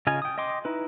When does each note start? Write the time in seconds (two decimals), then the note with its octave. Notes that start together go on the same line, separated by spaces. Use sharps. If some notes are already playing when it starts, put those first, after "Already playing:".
0.07 C#3 F4 D#5 F5 G#5
0.22 G5 D#6
0.38 D#5 G5 C6 D6
0.65 D#4 E4 B4